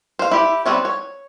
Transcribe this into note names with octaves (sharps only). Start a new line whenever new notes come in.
C5 F5
E4 G4
G3 B3 C4 F4 C#5
C#5